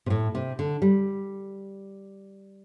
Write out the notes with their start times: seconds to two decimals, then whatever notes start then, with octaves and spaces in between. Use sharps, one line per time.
0.06 C3
0.10 A2
0.35 C3
0.59 D3
0.82 G3